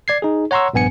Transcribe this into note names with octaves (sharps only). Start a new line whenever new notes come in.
D5 G#6 C7
D#4 G#4
C#5 F#5 A#5 C6 C#6 E6
A#1 G2 B3 G#5 C#7